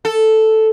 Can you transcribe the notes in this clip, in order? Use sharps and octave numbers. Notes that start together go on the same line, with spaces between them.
A4